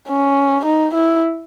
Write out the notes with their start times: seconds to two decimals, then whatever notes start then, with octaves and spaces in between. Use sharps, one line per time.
0.09 C#4
0.65 D#4
0.94 E4